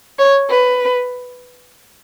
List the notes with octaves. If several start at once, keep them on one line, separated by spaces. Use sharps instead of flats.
C#5
B4